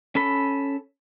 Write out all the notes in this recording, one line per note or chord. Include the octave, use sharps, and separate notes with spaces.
C#4 A4 B5